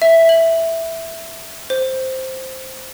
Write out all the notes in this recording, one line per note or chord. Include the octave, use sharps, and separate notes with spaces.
E5
F#7
C5